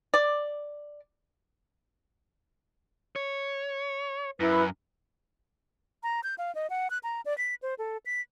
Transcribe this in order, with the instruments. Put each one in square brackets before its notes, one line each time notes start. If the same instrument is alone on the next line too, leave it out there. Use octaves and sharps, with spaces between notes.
[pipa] D5
[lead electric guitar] C#5
[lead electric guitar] F#2 [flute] E4 [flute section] B4
[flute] A#5
G6
F5
D#5
F#5
F#6
A#5
D5
B6
C5
A4
B6